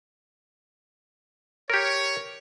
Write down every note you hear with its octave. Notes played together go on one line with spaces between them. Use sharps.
G4 A#4 C#5